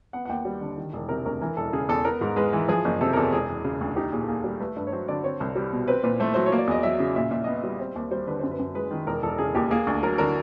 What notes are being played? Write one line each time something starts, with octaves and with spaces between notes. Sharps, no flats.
B3 F#5
F#5
D#2 G5
G3
D3
D#3
E1
C3 A#4
D2 A#4
E3 A#4
E1 A4
C#3 G#4
E2 A4
B3 A#4
G#2
G#3 B4
E3
F3 G#4
F#1
C3 A4
A#4
E2 A4
E1 G#4
E1
C#3
D2
D#4 G4
A#2 G#4
A4
A#3 G#4
G3
A3 B4
G2 B4
C#5
F#3 C5
D3 D5
C4 C#5
C2
G3
B2
C4 B4
A#2 B4
A3 C5
F#3 C5
C#5
A#3
D5
E2 D#5
F#3 E5
C#3
A#2 E5
A#2 E5
B3 D#5
E5
G3
C4
D#2
G3 C5
D3 B4
F#2 C5
B4
F#2
G#3 B4
D#3
E1 A#4
E1 A4
C#3 G#4
D#2 G4
A#3 G#4
D2
F#3 A#4
D3 A#4